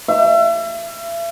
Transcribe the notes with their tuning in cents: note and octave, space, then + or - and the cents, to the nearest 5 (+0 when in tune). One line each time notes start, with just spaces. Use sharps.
E5 +40